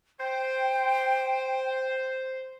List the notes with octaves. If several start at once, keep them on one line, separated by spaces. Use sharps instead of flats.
C5 G5